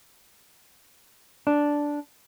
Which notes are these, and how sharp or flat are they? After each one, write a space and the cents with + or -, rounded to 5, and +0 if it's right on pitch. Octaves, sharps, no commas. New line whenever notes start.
D4 -5